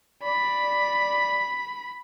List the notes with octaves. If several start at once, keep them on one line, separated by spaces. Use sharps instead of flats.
D5 B5